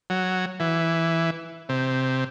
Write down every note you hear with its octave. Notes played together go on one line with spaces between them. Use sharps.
F#3
E3
C3